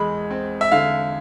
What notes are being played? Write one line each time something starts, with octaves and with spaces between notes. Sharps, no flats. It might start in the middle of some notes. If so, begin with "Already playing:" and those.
Already playing: E2 G#3 B5
C4
E5
D3 F5